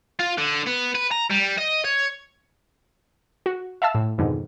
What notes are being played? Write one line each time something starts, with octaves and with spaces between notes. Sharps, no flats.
F4
D3
B3
B4
A#5
G3
D#5
C#5
F#4
E5 F5 A5 E6
A2
F2 G#2 B2 D3 D#3